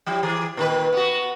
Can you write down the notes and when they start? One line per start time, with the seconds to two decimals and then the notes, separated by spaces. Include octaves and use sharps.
0.06 F3 G3 E4
0.23 E3 G#4
0.57 A#2 D#3 B4
0.93 B3 F#4